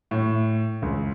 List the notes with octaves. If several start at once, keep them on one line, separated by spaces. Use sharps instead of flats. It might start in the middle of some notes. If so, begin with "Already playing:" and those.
A2
C#2